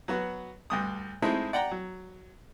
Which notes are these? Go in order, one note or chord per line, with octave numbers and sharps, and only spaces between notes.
F#3 B3 F#4
D2 G2 D#6
G#3 A3 C4 D#4 E4
D5 F#5 G5 A#5
F#3